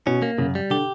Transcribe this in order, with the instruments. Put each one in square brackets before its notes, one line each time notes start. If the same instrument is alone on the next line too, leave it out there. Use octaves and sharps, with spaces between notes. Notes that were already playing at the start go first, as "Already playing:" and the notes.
[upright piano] B2 [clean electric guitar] C#4
[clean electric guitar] A#3
[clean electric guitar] F#2 [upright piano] C#3
[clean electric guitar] G3
[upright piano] D3 [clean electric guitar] G4